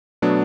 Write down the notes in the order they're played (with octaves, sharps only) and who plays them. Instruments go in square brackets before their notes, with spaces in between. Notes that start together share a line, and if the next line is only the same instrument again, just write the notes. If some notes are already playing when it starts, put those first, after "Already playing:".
[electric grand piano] B2 F#3 A3 B3 D4